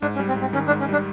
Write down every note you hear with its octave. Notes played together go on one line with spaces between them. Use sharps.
G#2 D4
C#4
G3
C4
G#2
C4
D#3 C#4
D4
G#2
C#4
G3 D4